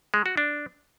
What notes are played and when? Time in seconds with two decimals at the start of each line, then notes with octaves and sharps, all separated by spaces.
0.14 G#3
0.26 F#4
0.37 D4